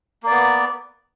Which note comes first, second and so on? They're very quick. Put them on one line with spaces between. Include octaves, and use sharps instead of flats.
A#3 D5 B3